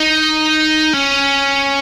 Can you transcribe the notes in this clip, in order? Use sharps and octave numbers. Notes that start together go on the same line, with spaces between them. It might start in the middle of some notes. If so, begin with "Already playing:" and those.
Already playing: D#4
C#4